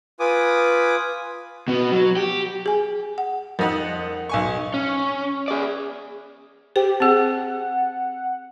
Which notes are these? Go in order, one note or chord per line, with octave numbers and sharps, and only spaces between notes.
F4 B4 G#5 D6 D#6
B2 B3
F#3
G4
G#4 G#5
F#5
F2 D#4 A#4 F#5
B1 G#5 C#6
C#4
G#4 D5
G4 C5 G5
C4 G#4 F#5